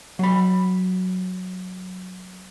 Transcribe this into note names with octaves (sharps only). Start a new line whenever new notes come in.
F#3 B5